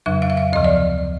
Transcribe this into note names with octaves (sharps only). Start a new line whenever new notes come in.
F2 C#3 F#3 E5
F5
E5
F5
D2 C3 F3 D#5
D5